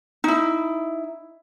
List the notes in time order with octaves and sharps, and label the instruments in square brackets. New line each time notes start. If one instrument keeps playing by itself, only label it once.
[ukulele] D#4 E4